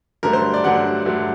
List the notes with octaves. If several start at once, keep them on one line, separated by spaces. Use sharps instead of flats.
G2 D3 F#3 A3 A#4
C5
D5
G2 D3 F#3 A3 F#5
G2 D3 F#3 A3